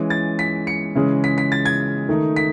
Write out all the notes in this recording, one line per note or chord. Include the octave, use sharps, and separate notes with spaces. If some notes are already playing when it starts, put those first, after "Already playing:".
Already playing: E3 G#3 C#4
A6
B6
C#7
C#3 E3 G#3 C#4
B6
B6
A6
G#6
D#3 A3 D#4
B6